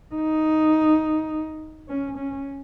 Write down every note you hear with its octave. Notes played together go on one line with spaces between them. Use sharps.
D#4
C#4
C#4